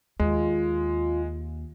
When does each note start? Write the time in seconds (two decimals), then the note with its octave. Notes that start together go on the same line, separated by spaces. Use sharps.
0.20 D#2 G#3 F4